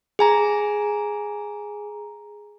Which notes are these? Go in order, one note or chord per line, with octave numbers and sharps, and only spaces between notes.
G#4 G#5 A#5